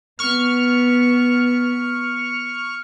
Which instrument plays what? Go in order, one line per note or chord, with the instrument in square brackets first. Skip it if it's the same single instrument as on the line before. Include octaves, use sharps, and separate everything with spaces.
[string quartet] B3 [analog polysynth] C#6 F6